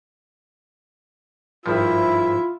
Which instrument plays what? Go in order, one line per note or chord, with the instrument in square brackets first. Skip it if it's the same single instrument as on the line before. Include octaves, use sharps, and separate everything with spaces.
[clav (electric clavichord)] G#1 G2 F3 [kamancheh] E4 E5 [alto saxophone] F4